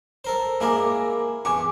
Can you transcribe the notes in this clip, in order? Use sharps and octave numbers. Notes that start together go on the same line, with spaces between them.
A4 A#4 C5
G#3 A#3 E4 A#4 G#5 D6
E2 G#5 C#6 D6